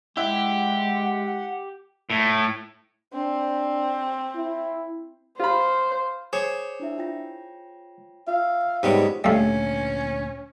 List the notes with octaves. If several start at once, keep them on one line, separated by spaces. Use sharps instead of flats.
G#3 E4 G4 F#5
A2
C4 D4
E4
F4 C5 B5
G#4 C5 C#5 D6
D4 E4 E5
F4 G5 A#6
F4 E5 F5 E6
G#2 C3 G3 G#3 B3 C#5
D2 A#2 G3 A3 C#4 E5 F5